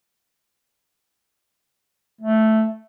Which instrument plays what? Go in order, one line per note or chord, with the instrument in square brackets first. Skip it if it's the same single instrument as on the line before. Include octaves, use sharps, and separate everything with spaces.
[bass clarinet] A3